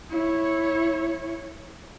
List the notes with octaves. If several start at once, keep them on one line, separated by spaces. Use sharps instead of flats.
E4 C#5